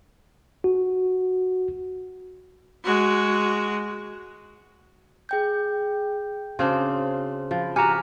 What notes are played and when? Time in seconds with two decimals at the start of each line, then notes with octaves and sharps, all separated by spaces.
0.64 F#4
2.84 G#3 F#4
5.29 G#4 G5 G6
6.59 C#3 C4 D4 F#4 C5 C6
7.51 F3 F4
7.76 F#4 G4 G#5 A#5 F6 C#7